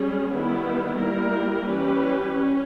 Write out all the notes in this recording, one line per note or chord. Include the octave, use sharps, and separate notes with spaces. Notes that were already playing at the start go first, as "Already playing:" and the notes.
Already playing: G3 C#4 G#4
D#3 G3 B3 E4
G3 A#3 E4 A#4
E3 G3 C#4 G4 B4
C#4